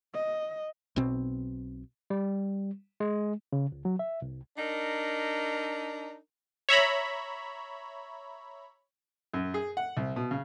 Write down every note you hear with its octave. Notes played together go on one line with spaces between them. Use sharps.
D#5
B1 B2 C4
G3
G#3
C#3
C#2
F#3
E5
C2
D4 D#4 A#4
C#5 E5 A#5 B5
F#2
G#4
F#5
C2
B2
C#3